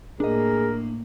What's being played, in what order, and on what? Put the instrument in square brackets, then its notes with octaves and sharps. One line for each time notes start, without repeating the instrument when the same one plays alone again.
[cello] A2 A#3 [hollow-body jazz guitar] D4 D#5 [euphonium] G#4 [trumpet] A#4